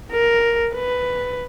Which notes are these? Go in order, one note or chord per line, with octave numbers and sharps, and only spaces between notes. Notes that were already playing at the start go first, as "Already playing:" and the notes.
A#4
B4